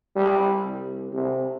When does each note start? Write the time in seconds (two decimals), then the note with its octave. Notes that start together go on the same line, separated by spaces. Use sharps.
0.16 G3
0.61 C2
1.12 C3